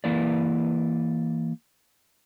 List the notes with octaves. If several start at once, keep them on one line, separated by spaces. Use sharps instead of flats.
E3 A#3 E4 B4 D5